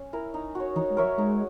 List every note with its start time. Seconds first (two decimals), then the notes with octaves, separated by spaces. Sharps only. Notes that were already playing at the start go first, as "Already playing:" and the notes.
Already playing: C#4
0.13 E4 A#4
0.34 D#4
0.55 F#4 C#5
0.76 E3 D#4
0.90 G#3
0.97 E3 A#4 C#5 E5
1.04 F#3
1.18 G#3 D#4